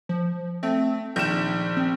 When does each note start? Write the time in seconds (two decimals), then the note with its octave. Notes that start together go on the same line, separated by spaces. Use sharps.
0.09 F3
0.63 A3 C4
1.16 A#1 D#3 G6 E7
1.77 C4